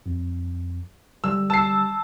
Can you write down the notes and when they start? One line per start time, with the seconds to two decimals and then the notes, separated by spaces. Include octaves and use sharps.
0.06 F2
1.24 D3 G3 E6
1.50 A5 E6 C7